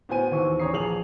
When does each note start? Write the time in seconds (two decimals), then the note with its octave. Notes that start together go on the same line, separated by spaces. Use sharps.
0.09 A2 B3 F#4 C5 G#5 D#7
0.31 D#2 E3 C4 C#6
0.60 E2 C#4 C#5 A#5 D#6 C7
0.73 A#1 G#4 F7 F#7